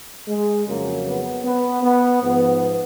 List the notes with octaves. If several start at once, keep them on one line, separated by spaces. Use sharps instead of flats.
G#3
F2 C#3 F#3 A#3
B3
B3
B3
G#2 F3 B3